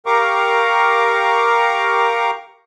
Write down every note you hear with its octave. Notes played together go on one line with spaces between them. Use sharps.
G4 A#4 F5 A#5 C#6 D6